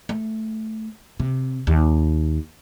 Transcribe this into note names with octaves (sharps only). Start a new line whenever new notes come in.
A3
C3
D#2